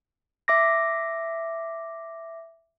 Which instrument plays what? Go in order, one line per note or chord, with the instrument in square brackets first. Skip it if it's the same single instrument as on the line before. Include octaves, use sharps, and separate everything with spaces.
[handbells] E5 D6 A#6